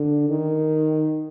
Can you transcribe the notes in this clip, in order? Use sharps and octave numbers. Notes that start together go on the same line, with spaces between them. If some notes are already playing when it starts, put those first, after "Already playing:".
Already playing: D3
D#3